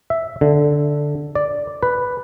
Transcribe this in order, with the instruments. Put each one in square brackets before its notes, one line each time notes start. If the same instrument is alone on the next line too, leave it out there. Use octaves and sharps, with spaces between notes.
[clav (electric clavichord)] E5
D3
D5
B4